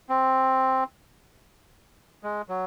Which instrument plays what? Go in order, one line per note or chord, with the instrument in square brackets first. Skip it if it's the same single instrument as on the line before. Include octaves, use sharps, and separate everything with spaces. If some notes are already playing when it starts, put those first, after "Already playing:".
[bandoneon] C4
G#3
F#3